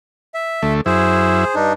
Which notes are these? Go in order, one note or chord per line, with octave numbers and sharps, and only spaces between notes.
E5
D2 A3
F#2 E4 G#4 C5
G2 D4 D#4